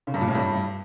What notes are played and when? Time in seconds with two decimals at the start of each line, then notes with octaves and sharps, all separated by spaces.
0.07 C#3
0.14 G2
0.21 A#2
0.28 A2
0.35 G2